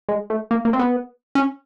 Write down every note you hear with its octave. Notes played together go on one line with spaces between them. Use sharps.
G#3
A3
A#3
A#3
C4
B3
C#4